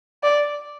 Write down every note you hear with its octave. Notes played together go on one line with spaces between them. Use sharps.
D5